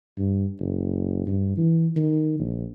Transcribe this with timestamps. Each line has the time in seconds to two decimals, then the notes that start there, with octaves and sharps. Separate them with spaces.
0.18 G2
0.60 F#1
1.27 G2
1.57 E3
1.96 D#3
2.39 A#1